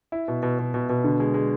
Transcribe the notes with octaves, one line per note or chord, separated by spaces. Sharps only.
E4
B2
B2
B2
B2
B2
D3
G#3
G#3